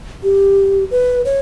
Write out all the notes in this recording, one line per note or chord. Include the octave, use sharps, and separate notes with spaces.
G4
B4
C#5